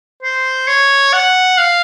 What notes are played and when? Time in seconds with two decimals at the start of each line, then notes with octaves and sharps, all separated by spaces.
0.22 C5
0.68 C#5
1.13 F#5
1.58 F5